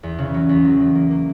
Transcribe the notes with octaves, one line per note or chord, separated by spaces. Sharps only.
E2
C#3
F#3
E2
F#3
F#3
A#3
A#3